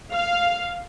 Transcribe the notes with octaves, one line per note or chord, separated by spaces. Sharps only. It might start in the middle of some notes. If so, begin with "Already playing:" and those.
F5